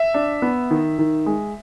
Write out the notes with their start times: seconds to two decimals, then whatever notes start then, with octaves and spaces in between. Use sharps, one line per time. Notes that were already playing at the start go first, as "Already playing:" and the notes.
Already playing: E5
0.14 D4
0.42 B3
0.71 D#3
0.99 D#3
1.26 G#3